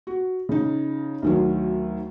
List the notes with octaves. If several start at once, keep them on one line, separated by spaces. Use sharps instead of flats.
F#4
C#3 D#4
D2 D#3 F#3